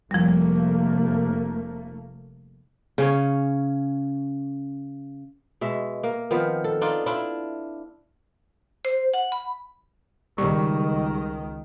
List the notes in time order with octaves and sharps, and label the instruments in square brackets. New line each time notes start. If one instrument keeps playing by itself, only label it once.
[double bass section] F1 A3 A#3 [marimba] F3 G3
[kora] C#3 C#4 C#5
B2 G#3 E5
A#3
D#3 F3 B3 C4
A4
D4 D#4 F4 D5
D4 E4 F4
[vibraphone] C5
F#5
B5
[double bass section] C#2 D#3 [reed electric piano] G3 C#6